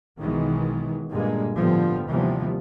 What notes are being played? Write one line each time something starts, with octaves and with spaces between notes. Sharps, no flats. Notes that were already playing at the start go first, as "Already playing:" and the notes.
B1 B2 D#3 E3 G#3
G2 A#2 D3 G#3 A#3
A2 D3 F3 G3 B3
D#2 C3 E3 F3 G3 B3